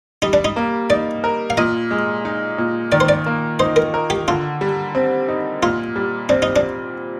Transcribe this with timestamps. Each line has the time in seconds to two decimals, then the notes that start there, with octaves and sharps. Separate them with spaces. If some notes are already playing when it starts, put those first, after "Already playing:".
0.22 G3 D#4
0.33 D4
0.45 D#4
0.56 A#3
0.90 D#4 D5
1.24 A#4
1.50 F5
1.57 A#2 D#5
1.91 G#3
2.25 D#4
2.58 A#2
2.92 D#3 D5
3.00 C5
3.09 D5
3.26 A#3
3.59 D#4 C5
3.76 A#4
3.94 A#4
4.10 G4
4.28 D3 F4
4.61 G3
4.95 C4
5.28 D#4
5.62 A#2 F4
5.96 G3
6.29 C4 D4
6.42 D#4
6.56 D4